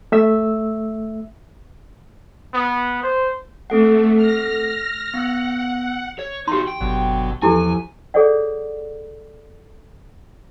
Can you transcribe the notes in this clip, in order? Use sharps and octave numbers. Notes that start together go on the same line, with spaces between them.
A3 E5 E6
B3
C5
A3 C4 A4 F#5
F6 A#6
B3 F#5 E6
C#5
D#4 F#4 G4 C6
G5
G1 B2 D3 F#3
E2 F3 E4 G4 A4 G#5
G#4 A4 C#5 D5 F#5